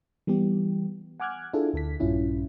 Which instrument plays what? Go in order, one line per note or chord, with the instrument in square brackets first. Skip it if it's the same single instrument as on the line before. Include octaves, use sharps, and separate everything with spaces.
[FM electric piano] E3 G3 B3 G4
F#5 G#5 D6 F6 F#6 G#6
D4 E4 F4 G#4 A4
D2 A4 B6
A#1 G2 C#4 E4 F4